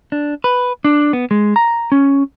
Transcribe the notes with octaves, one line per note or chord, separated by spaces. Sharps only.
D4
B4
D4
B3
G#3
A#5
C#4